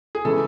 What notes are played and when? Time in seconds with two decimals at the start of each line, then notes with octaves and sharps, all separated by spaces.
0.15 G#4
0.25 C#3 E3 G#3 A4